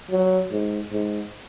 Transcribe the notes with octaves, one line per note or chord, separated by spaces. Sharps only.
F#3
G#2
G#2